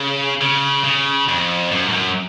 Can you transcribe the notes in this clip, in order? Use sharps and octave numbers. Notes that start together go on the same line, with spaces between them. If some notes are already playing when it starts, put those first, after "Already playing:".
Already playing: C#3
C#3
C#3
F2
F#2
G#2
F#2